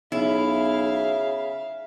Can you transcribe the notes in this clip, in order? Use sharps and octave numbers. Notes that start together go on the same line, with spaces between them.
B1 C#3 E4 E5 F5